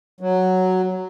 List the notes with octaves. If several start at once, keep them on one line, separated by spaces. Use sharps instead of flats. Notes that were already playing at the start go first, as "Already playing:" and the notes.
F#3